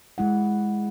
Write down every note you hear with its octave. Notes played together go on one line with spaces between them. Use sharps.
G#3 E4 F#5